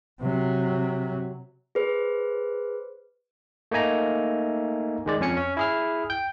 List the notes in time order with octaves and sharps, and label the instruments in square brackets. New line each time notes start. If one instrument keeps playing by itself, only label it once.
[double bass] C3 F#3
[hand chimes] G#4 B4 C5
[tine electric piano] A3 A#3 D#4 G#5 A#5
D#3 G#3 D5
F2 C#4 G#5 C#7
C#4
E4 G#4 F6
G5 G6